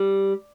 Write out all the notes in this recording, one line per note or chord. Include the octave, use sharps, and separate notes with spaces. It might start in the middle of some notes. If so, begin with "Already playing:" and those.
Already playing: G3